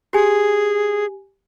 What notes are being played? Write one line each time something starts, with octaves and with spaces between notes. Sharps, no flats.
G4 G#4 G#5